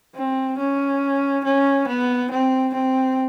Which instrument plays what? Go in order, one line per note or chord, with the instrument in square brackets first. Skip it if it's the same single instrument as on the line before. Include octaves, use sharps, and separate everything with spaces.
[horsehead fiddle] C4
C#4
C#4
B3
C4
C4